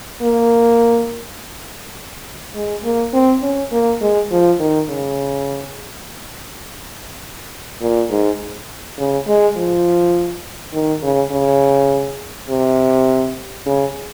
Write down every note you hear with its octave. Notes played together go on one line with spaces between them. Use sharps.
A#3
G#3
A#3
C4
C#4
A#3
G#3
F3
D#3
C#3
A#2
G#2
C#3
G#3
F3
D#3
C#3
C#3
C3
C#3